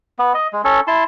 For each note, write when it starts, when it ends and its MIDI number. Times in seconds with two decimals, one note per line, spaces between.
0.19 0.33 59
0.34 0.47 75
0.53 0.62 56
0.64 0.80 61
0.64 0.80 69
0.87 1.04 64
0.87 1.04 81
0.87 1.04 84